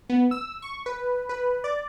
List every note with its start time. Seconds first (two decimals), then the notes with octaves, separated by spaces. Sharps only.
0.10 B3
0.31 E6
0.62 C#6
0.86 B4
1.29 B4
1.64 D5